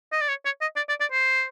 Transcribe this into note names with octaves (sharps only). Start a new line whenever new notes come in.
D#5
D5
C#5
C#5
D#5
D5
D5
D5
C5